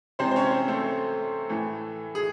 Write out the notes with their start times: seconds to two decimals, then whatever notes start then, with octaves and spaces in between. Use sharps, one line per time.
0.19 C3 E3 G#3 C4 C5
0.31 C5
0.36 C#4 C#5
0.51 C4 C5
0.68 A3 A4
1.49 A2 E3 A3
2.15 G#4